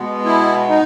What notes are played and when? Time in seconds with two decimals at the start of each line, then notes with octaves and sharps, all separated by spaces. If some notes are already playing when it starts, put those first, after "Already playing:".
Already playing: B2 G#3 B3
0.25 E4
0.69 D#4